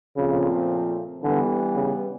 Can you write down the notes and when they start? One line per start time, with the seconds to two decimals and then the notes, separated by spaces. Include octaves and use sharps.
0.17 A#2 C#3 F3 A3 C4 F4
1.23 D3 E3 G3 B3
1.76 C#3